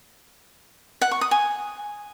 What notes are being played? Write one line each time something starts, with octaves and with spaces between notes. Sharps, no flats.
F#5
C#6
D#6
G#5